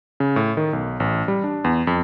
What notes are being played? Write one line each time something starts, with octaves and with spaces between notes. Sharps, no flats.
C#3
A2
D#3
B1
A1
G3
D4
E2
F2